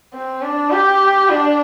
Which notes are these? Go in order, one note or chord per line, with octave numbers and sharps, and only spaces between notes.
C4
D4
G4
D4